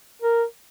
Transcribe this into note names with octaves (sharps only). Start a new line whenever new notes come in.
A#4